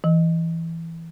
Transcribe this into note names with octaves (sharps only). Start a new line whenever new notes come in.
E3